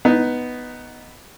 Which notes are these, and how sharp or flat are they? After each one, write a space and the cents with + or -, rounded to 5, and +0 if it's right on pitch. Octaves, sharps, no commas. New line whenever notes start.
B3 +0 D#4 +0